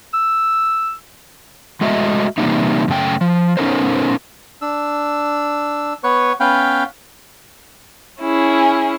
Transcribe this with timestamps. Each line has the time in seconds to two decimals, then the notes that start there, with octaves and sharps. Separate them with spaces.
0.14 E6
1.81 G#3 A3 F#4 D#5 E5
2.38 C3 E3 G3 A#3 D#4 E4
2.88 F#2 C#3 A3 G5
3.21 F3
3.57 B3 C#4 D#4 A4 A#4 C5
4.62 D4 E6
6.04 B3 B4 C#5 C#6
6.40 B3 C#4 B4 F5 G5
8.21 C#4 E4 G#4